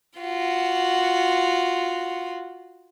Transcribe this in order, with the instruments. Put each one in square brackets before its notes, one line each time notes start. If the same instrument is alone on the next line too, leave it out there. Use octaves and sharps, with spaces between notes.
[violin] F4 F#4